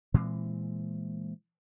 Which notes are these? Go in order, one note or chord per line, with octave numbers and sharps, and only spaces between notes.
A#2 E3 G#3 C4